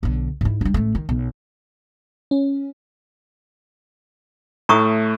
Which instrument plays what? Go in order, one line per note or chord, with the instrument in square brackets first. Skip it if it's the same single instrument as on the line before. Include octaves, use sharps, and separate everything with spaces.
[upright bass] B1 D3
G#2 E4
G3 D4
A1 A3
D#3
B1
[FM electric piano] C#4
[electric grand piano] A2 A3 [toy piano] A#5 C#6 D#6